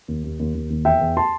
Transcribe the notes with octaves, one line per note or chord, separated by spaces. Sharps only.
D#2
D#2
D#2
D#2
D#2
E2 E5 G5
E2
A5 C6